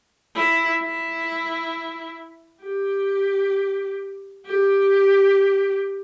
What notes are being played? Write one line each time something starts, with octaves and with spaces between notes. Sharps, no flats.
E4
E4
G4
G4